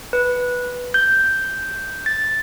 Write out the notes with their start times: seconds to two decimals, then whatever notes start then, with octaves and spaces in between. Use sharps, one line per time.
0.13 B4
0.94 G6
2.06 A6